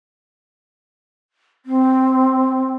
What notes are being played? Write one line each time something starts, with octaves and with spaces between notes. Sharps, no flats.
C4